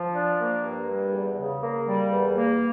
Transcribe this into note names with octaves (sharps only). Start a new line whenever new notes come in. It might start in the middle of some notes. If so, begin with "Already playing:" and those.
Already playing: F3
D4
A#3
G2
G3
E2
C#3
A#3
G3
E2
A#3